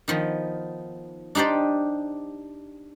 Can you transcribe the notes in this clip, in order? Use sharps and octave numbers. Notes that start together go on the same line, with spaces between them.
D#3 F3 B3
D4 D#4 G4 C5 D5